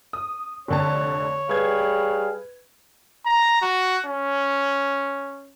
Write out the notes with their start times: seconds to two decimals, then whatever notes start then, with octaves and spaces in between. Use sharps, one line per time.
0.13 D#6
0.68 F1 D3 C#5 A5
1.49 G3 G#4 B4 F5 G#6
3.26 A#5
3.62 F#4
4.06 C#4